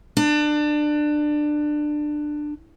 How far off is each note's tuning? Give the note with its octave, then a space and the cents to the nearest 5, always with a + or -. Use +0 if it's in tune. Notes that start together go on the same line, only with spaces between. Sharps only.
D4 +20